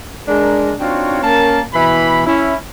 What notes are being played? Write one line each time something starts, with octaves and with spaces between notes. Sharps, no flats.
G#3 D4 A#4
C4 D4 D#4 F4 F#4 C#5
A#3 C#4 A#4 A5
B2 E3 B5
C#4 E4